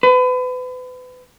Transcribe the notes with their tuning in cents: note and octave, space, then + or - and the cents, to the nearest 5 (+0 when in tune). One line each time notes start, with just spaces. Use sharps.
B4 +35